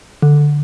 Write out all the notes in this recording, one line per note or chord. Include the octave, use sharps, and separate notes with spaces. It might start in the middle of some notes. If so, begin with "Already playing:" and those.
D3